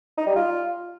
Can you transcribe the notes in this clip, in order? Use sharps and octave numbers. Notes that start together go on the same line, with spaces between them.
D#4
G3
F4